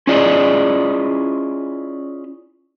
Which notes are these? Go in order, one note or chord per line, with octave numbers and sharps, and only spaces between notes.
C#4 E4 F4 G#4 D5 D#5